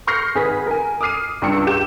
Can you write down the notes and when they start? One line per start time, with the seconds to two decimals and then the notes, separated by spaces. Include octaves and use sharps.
0.07 C6 C#6 F6 G6 A#6 C7
0.35 G#1 G#4 B4 B6
0.66 A#4 G#5
1.01 D6 D#6 F6 C7 D#7
1.42 C#2 G2 D4 G5 E6 C#7
1.67 G4 G6 E7